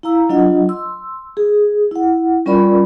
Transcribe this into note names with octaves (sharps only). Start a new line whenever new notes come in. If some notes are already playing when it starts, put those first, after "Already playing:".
E4 F5 A#5 E6
F#3 D4 F4 D#5 F#5
C6 E6
G#4
E4 F#5
G3 C#4 F4 A#4 D5 B5